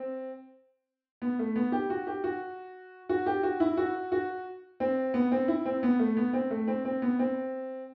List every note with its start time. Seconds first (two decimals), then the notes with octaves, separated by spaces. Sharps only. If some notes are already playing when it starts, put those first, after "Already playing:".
Already playing: C4
1.22 B3
1.39 A3
1.56 B3
1.72 G4
1.90 F#4
2.07 G4
2.24 F#4
3.09 F#4
3.26 G4
3.43 F#4
3.60 E4
3.77 F#4
4.12 F#4
4.80 C4
5.14 B3
5.32 C4
5.48 E4
5.65 C4
5.83 B3
5.99 A3
6.17 B3
6.33 C4
6.51 A3
6.68 C4
6.85 C4
7.02 B3
7.19 C4